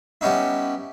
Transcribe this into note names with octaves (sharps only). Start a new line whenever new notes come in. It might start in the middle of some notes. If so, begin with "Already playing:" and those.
G3 B3 C#4 D#4 E4